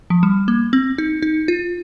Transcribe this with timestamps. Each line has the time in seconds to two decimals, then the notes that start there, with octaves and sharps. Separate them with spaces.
0.10 F3
0.23 G3
0.48 A#3
0.73 C4
0.98 D#4
1.22 D#4
1.48 F4